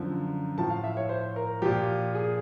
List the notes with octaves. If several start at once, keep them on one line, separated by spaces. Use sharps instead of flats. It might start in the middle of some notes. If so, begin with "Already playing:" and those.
Already playing: F#2 D3 F3
A2 F3 A5
F5
E5
C#5
C5
A#4
A#2 F3 G4
G#4